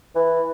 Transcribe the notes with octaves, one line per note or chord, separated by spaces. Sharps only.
E3